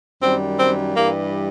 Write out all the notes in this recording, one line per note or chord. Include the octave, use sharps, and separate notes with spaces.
F#2 D#3 G3 C4
C4
G2 E3 G3 A#3